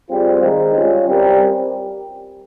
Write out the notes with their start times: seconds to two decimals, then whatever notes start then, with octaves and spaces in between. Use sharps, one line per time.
0.08 G3 C4 F4 G#4 C5
0.41 D#3 G#3 D#4
0.73 G3 C#4 F4
1.06 G3 C4 G4 A#4